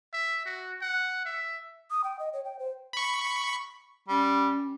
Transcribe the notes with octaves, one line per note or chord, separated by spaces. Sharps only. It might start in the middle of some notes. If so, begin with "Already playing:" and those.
E5
F#4
F#5
E5
D#6
G5
D#5
C#5
G5
C5
B5 C#6
G3 C#4